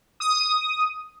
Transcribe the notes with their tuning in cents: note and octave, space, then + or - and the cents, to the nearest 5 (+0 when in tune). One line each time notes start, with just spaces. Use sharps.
D#6 +5